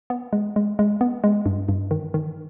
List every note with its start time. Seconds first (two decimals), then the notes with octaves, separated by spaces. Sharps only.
0.10 B3
0.33 G#3
0.56 G#3
0.79 G#3
1.01 B3
1.24 G#3
1.46 G2
1.69 G2
1.91 D#3
2.14 D#3